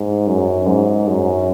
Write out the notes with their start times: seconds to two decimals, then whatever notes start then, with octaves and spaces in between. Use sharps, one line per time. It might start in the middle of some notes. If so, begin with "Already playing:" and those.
Already playing: G#2
0.27 F#2
0.67 G#2
1.08 F#2